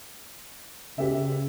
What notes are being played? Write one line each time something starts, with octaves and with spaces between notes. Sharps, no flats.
C#2 C#3 G4 E5